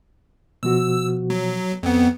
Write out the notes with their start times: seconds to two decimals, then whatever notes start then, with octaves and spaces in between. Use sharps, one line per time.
0.63 B2 F3 F#4 E6
1.30 F#3
1.83 F2 B3